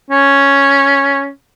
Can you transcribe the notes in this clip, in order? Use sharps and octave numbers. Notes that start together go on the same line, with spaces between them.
C#4